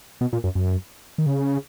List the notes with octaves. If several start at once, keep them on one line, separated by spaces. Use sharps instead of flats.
B2
A#2
F#2
F#2
D#3
C#3